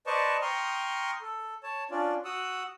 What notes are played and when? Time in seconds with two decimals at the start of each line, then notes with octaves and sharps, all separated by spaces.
0.07 B4 C5 D5 D#5 A5 C#6
0.42 G5 A#5 C6 C#6 D#6 F6
1.22 A4
1.63 C#5 A5
1.91 C#4 D4 F4 D5
2.25 F#4 F#5 D#6 E6